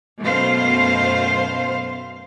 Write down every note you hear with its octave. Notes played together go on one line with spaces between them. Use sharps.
F#2 B2 A3 C5 F5